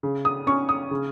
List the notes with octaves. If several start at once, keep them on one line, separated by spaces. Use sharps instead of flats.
C#3
D#6
C#4 C#6
D#6
C#3